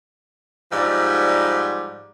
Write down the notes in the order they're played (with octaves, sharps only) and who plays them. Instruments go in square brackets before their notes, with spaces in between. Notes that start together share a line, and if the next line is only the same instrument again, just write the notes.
[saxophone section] G#2 F3 G3 D5